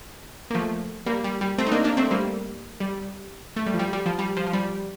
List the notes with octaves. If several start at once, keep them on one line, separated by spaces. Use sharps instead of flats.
A#3
F3 A3
G3 A#3
G3
G3
A3 C4
D#4
A#3 D4
A#3 D4
A3 C4
G3 A#3
G3
A3
G3
F3
G3
G3
F3
G3
F3
F3
G3